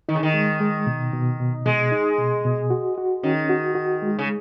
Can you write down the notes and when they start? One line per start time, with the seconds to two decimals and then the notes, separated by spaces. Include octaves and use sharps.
0.09 D#3 D#4
0.15 C#3
0.23 D#3
0.34 G#3
0.60 G#3
0.87 B2
1.13 B2
1.40 B2
1.66 B2 G#3
1.91 D#4
2.18 B2
2.45 B2
2.70 F#4
2.98 F#4
3.23 D#3 C#4
3.50 F#4
3.75 F#4
4.02 G#3
4.19 C#3